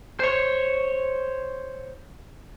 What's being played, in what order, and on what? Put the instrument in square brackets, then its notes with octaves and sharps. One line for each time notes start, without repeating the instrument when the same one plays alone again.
[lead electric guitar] C5 C#5